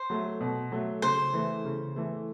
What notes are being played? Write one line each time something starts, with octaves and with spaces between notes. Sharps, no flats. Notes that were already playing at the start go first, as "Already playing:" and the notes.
Already playing: C5
F#3 A3
B2
F#3 A3
C#3 C5
E3 A3
C#3
E3 A3